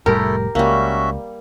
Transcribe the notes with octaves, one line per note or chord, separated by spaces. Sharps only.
F1 A2 G3 A3 E4 G4 A4 A#4
C#2 G3 A#3 C#4 F#4 E5